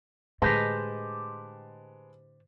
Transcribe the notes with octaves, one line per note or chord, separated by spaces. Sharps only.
A2 D3 G#3 G4 B4 C5 D#5 A5